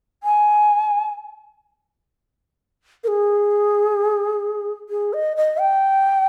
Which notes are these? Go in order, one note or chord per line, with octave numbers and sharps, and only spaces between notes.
G#5
A#4
G#4
G#4
D#5
D#5
G5